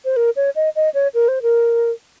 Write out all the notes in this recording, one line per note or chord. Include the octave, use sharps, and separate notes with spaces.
C5
A#4
C#5
D#5
D#5
C#5
A#4
C5
A#4